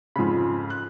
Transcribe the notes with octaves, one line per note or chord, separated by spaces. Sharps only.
F2 G#2 C#3 B5
F#6